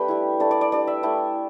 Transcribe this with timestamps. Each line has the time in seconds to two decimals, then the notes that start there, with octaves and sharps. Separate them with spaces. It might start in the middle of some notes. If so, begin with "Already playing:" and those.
Already playing: A3 D4 G4 B4 G5
0.08 G3 E4
0.40 A3 D4 D5
0.51 D5
0.61 D5
0.72 G3 D4 D5
0.87 E5
1.03 A3 E4 G5